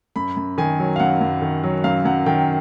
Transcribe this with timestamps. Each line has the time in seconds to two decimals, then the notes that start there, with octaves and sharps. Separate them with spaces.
0.16 F#2 B5
0.37 F#2
0.58 D#3 G#5
0.80 F#3
0.96 F5
1.00 F#2 F#5
1.21 F#2
1.42 D#3
1.64 F#3
1.84 F#2 F5
2.05 F#2 F#5
2.26 D#3 G5